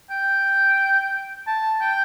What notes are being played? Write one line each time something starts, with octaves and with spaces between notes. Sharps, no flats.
G5
A5
G5